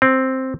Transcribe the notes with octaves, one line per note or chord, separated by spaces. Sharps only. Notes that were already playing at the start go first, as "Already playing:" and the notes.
C4